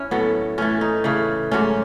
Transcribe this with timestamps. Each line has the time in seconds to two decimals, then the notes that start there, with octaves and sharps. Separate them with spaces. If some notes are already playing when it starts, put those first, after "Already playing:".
Already playing: C#4 E4
0.11 A2 F#3 A3 B3
0.58 A2 E3 A3 C#4
0.81 D#4
1.04 C#3 E3 A3
1.51 G#2 F#3 A3 C#4